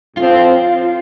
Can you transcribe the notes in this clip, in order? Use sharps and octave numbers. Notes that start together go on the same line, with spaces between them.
A2 F3 C4 F4